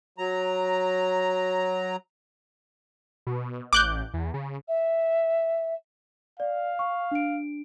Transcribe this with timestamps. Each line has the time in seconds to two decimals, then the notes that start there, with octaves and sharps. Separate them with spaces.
0.18 F#3 A#5
3.27 B2
3.73 A1 D6 F#6 G6
4.14 E2
4.34 C#3
4.68 E5
6.40 D5 F5
6.79 C#6
7.11 D4 D7